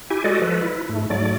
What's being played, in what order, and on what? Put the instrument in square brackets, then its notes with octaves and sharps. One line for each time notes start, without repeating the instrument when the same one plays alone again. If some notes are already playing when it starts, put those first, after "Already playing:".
[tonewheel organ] E4 G4 G#5
G#3 F#4 A4 D5 D#5
F3 A4 B4
E4
G#2 A3
G#2 F#3 A3 D5